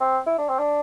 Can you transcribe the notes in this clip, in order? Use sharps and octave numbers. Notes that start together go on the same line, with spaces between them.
C4
E4
D4
C4
D4